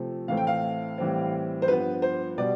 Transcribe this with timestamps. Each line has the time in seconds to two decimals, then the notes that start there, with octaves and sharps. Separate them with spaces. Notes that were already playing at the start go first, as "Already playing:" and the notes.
Already playing: C3 F3 A3 C4
0.28 A2 E3 A3 C4 F5
0.37 G5
0.47 F5
0.98 A2 E3 G3 C4
1.62 C5
1.67 G2 F3 B3 B4
2.02 C5
2.38 B2 G3 B3 D5